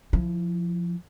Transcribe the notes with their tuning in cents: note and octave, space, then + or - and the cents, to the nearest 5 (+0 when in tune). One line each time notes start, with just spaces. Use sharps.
F3 +0 E4 +20